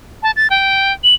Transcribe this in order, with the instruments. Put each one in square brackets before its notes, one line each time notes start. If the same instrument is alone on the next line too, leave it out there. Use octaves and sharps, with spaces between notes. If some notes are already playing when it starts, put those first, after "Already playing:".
[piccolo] A5
A6
G5
F#7